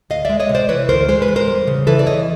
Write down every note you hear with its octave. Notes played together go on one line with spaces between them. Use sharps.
D2 D#5 F5
G#3 D5 E5
C#5 D#5
C3
C5 D5
E3 B4 C#5
D2 A#4 C5
G#3 C5
B4
E2
A#4 C5
G3
C#3
E3 A4 B4
D5
E2 C#5 D#5